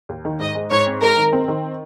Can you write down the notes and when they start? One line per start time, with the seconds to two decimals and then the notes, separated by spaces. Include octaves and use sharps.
0.09 D#2
0.25 D#3
0.40 G#2 D#5
0.55 G#3
0.71 G#2 C#5
0.86 C4
1.01 G#3 A#4
1.17 D#3
1.33 C4
1.48 D#3